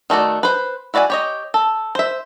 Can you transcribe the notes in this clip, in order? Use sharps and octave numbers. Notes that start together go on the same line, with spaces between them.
D#3 A3 F#4 D5
B4 C5
E4 F#4 D5 F5 G#5
G4 C#5 D#5
A4
C5 E5